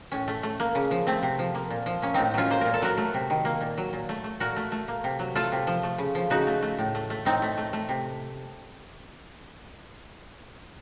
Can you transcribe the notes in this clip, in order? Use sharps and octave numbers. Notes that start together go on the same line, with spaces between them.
A2 C#4
A3
A3
A#3
C#3
F3
A3 C4
C3
F3
A#3
A#2
F3
A#3 C#4
A2 C4 D#4
F#3 C#4 F4
A#3 C5
A#2 A#4
A4
F#3 F#4 A#4
A3
C3
D#3
A#3
A#2
F#3
A#2
A3
A3
A#2 F#4 A#4
A3
A3
A#3
C3
F#3
A3 F4 A4
C3
F3
A3
C#3
F3
C#3 D#4 F#4
A3
A3
A2
A3
A3
A2 C4 D#4
A3
A3
A3
C3